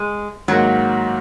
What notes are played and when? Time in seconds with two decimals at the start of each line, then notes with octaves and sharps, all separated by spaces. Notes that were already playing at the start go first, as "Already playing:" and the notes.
Already playing: G#3
0.48 G#2 D#3 F#3 A#3